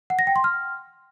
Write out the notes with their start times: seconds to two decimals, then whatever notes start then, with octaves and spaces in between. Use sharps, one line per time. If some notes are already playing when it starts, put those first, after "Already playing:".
0.10 F#5
0.19 A#6
0.27 G5
0.36 C6
0.44 F6